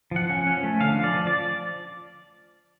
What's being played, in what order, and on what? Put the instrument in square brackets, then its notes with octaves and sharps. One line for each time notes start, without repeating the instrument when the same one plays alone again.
[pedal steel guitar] F3 F#5
C#4
C#4
A3
D3 F5
F3
D5
F3
D5